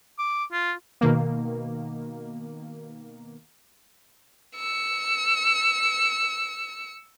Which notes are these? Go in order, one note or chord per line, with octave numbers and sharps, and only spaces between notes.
D6
F4
B2 D#3 A#3
E6 C#7